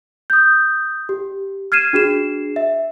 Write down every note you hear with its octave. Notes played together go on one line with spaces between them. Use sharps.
D#6 G6
G4
F6 G#6 C7 D#7 E7
D4 F#4 G#4 C7 E7
E5